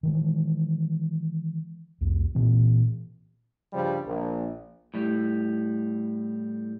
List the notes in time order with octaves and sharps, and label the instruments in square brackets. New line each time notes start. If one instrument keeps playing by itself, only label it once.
[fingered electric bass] D#3 E3 G#3
C2 F2
A#2 E3 C4
[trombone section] G2 C#3 F3 G3
A#1
[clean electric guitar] A2 G3